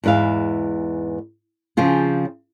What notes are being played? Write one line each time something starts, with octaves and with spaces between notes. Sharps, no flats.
E2 G#2 B4 E5 F5
C#3 F3 C4 F4 G#4